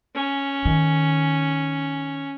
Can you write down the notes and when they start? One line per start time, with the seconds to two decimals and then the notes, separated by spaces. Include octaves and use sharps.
0.15 C#4
0.65 D#3